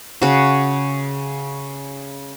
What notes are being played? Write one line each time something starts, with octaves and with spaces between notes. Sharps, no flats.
C#3 F#4